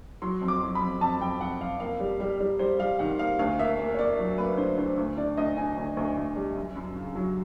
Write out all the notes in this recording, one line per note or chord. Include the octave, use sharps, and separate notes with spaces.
F#3 C6
F2
D6
F#3
B5
F2
F2 A5
F2 G5
F2 F#5
F2 F5
A#3 F5
G3
G3
G3
G3 C5
G3 F5
D#3 F#5
A#3 F5
D2 F5
A#3 E5
A#3
C#5
A#3 D5
F#3
A#3 B4
D3 C5
D3 C5
D2
D3 D5
D2 D#5
D3 G#5
D2
D2
D2
G3
F#2
F#2
C#3
F#3